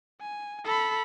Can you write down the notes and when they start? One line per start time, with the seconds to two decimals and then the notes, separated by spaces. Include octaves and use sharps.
0.21 G#5
0.65 A4 B5